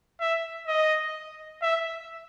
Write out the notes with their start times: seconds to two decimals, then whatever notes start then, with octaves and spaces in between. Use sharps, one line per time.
0.20 E5
0.67 D#5
1.62 E5